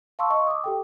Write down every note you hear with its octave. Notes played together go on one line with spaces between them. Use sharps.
F5 A5 C6 C#6 E6
D#5 C#6 E6
D6 D#6
G4 A4 G5